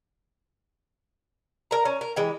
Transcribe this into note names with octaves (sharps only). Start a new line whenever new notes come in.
A#4 A#5
C#4
A#4
E3 G#3 G4